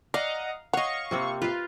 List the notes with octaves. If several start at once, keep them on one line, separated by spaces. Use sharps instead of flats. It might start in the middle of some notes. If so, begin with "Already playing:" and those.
D5 D#5 F5 F#5 A#5
C#5 D#5 F5 F#5 C#6
C3 A#3 C4
F4 B4 F5